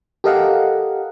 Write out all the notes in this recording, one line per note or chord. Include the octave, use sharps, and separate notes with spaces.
G4 A4 A#4 D#5 F5 F#5